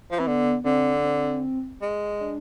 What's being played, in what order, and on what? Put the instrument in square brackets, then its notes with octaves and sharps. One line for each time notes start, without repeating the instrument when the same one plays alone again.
[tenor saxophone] F3
[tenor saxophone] E3 [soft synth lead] C4
[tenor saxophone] D3 [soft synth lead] B3
[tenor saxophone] D3 [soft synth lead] C4
[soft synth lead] C4
[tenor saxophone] G#3
[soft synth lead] D4